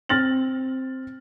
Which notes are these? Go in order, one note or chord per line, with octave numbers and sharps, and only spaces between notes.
C4 F6 A6 A#6 F#7